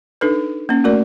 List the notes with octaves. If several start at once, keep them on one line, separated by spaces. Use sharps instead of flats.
D4 D#4 A4 B4
A#3 C#4
A3 F#4 A#4 D5